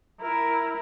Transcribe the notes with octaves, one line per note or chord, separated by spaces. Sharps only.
E4 A#4